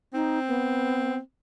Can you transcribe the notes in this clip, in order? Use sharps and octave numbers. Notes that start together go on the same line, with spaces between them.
C4 D#4
B3